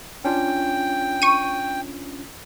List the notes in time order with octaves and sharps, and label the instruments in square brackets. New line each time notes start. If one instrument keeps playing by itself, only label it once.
[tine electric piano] C#4 D4 F4 [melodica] G5
[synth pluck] C#6 D#7